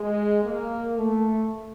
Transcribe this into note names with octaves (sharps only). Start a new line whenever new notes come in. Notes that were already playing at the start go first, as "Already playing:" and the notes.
Already playing: G#3
A#3
A3